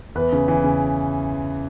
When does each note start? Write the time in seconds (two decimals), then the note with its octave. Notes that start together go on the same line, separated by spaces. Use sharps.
0.15 E2 B4
0.32 C#3
0.48 E3
0.64 C#3